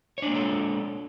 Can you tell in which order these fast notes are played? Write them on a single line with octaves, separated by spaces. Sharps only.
C#5 D4 A#3 G#3 A4